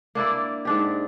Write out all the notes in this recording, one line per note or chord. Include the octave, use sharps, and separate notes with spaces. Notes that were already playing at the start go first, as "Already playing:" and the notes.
A#3 D4 E4 D5
G#2 D4 G4